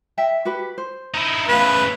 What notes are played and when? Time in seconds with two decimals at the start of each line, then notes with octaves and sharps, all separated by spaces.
0.17 D#5 E5 G5
0.45 F#4 G4 B4
0.78 C5
1.14 D#4 E4
1.48 A2 C#3 B4 C5 F5